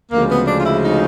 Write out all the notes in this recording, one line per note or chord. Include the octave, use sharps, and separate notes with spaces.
D2 C#3 F3 G#3 A#3
B3
D4
F4
E4
D#4